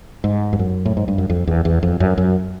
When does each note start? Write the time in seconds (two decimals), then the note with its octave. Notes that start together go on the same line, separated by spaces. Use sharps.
0.24 G#2
0.53 G2
0.59 F#2
0.86 A2
0.97 G#2
1.08 G2
1.18 F#2
1.30 F2
1.47 E2
1.65 E2
1.83 F2
2.00 F#2
2.18 F#2